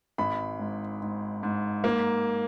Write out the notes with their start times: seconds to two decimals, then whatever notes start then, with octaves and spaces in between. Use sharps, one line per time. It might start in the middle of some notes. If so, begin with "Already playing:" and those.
0.18 G#1 B5
0.59 G#2
1.02 G#2
1.43 G#2
1.84 A#3